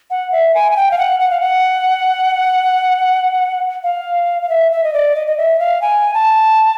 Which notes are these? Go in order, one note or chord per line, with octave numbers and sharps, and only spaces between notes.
F#5
E5
G#5
G#5
G5
F5
F#5
F#5
F5
F#5
F5
F5
E5
E5
D#5
D5
D#5
D#5
E5
F5
G#5
A5